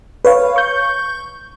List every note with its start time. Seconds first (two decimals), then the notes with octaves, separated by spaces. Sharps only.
0.25 B4 C#5 F5
0.56 C#6 G6